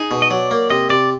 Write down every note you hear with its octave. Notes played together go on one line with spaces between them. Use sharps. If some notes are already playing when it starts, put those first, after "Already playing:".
Already playing: D#4 G#4
B2
D#5
F#3 D5
A#3
C3 D#5
C3 D5